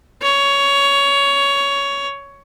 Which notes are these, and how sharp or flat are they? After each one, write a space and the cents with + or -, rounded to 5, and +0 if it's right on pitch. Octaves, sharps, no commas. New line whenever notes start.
C#5 +15